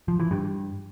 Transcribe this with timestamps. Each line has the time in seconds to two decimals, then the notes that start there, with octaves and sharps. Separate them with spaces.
0.08 F3
0.20 E3
0.31 G2